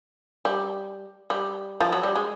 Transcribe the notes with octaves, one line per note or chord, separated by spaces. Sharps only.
G3
G3
F3
F#3
G3
G#3